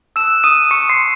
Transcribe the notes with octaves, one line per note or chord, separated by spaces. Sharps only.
A5 D#6 E6 F#6 E7
D#6 D#7
C#6 C#7
C6 C7